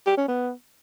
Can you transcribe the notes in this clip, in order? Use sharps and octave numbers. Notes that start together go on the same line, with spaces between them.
G4
C#4
B3